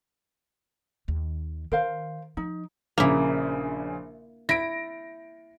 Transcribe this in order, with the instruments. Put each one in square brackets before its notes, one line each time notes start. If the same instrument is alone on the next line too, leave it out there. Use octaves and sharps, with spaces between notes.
[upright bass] D#2 D#3
[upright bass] D#3 [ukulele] A#4 C5 F5
[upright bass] F3 [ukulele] D#4
[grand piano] A#1 C#3 [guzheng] A#3 E4
[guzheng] E4 [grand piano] A#6 D7